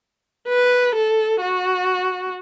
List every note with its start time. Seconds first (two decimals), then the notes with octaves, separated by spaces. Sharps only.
0.49 B4
0.95 A4
1.42 F#4